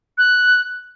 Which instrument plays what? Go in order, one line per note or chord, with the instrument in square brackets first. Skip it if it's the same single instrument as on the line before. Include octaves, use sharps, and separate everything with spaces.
[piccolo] F#6